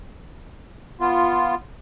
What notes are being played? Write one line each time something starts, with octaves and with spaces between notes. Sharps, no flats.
B3 F4